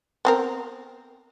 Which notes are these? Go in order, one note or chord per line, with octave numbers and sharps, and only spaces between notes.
B3 C4 A#4